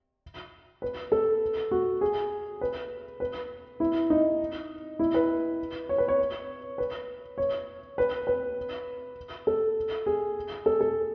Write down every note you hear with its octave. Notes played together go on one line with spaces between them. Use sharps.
B4
A4
F#4
G#4
B4
B4
E4
D#4
E4
B4
C#5
B4
C#5
B4
C#5
B4
B4
A4
G#4
A4
A4